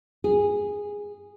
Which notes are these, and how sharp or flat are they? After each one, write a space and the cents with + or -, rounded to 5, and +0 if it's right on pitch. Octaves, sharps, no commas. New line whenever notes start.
G#4 -10